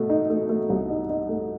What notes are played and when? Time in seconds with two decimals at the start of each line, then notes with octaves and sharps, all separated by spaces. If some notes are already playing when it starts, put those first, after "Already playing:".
Already playing: B2 A3
0.10 D#4
0.30 A3
0.49 A3
0.70 C2
0.90 D#4
1.10 D#4
1.29 A3